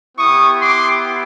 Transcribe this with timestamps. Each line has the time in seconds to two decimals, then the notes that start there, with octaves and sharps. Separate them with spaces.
0.18 B3 E4 G4 C#6 D#6
0.60 C6 D6